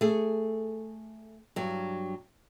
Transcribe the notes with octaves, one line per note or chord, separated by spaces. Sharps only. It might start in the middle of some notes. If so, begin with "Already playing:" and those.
A3 G#4
G2 F#3